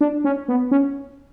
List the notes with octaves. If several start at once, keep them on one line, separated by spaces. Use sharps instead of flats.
D4
C#4
B3
C#4